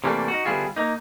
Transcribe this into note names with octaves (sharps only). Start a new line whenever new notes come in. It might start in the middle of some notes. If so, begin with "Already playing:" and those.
C3 E3 G3 A3 A#3 D4
D#4 F#4
D3 G3 B3 E4 F4 G#4
A#3 D#4